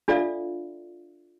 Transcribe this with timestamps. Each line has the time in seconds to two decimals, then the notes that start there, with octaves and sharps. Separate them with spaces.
0.08 D4 F4 A4 D5 E5 F5